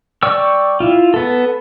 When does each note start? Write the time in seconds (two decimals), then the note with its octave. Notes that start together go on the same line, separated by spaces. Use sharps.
0.23 D5 G5 C#6 E6
0.80 E4 F4
1.14 B3 A4